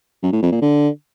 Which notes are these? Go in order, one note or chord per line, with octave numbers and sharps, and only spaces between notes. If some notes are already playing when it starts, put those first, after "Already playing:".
F#2
A2
F2
A#2
D3